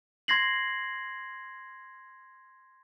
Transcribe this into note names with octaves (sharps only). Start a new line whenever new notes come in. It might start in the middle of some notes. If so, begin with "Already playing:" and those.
C6 G#6 A#6 C7 F#7